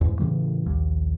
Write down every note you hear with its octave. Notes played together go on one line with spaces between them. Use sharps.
E2 G#2
A2 C#3 E3 G3
A#1 D#2